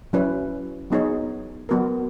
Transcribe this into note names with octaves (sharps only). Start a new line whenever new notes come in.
F#3 C#4 E4 B4
F#3 B3 D#4 G#4 C#5
F#3 B3 F#4 A#4